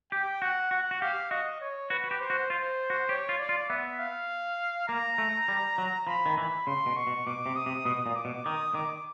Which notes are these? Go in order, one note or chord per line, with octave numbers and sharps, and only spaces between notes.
G4 G5
F#4 F#5
F#4 F#5
F#4
G4 F5
F#4 D#5
C#5
F#4 B4
F#4
G4
C5
F#4
F4 C5
F#4
G4 C#5
F4
D5
F4
B3 E5
F5
A#3 A#5
A3
G3
F#3
F3 B5
D#3
E3 B5
C#3 C6
B2
C#6
B2
B2 D6
C3
D#6
C3
B2 D#6
A#2
D6
B2
D#3 D#6
D#3 D6